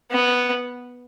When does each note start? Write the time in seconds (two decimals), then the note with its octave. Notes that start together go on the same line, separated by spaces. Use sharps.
0.11 B3